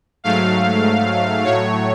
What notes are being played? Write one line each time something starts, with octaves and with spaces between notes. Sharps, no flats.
G#2 F#3 A3 F5
A2 F#3 A3 C#5